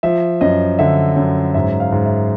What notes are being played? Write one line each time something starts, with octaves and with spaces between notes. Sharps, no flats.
F3 E5
F#2 D#5
D3 E5
F#2
G#2 E5
F5
G#2
E5